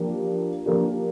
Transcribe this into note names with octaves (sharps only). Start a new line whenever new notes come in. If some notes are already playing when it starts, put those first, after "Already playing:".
Already playing: F3 A#3 D4 G4
F3 A#3 D4 G4